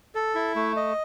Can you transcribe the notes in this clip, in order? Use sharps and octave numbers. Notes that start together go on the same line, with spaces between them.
A4
E4
A3
D#5